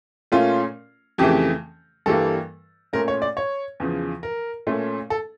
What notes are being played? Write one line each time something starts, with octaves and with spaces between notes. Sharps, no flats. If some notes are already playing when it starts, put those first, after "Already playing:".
A#2 A3 C#4 F4
F2 C#3 E3 A3 G4
G2 E3 G3 A#3 A4
A#2 A3 C#4 A#4
C#5
D5
C#5
E2 C#3 F3
A#4
A#2 A3 C#4
A4